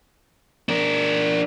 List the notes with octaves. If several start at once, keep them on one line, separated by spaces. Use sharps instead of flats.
D4 A#4